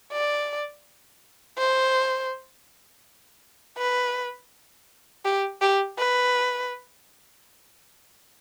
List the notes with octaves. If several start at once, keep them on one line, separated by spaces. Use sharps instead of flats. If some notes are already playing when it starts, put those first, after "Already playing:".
D5
C5
B4
G4
G4
B4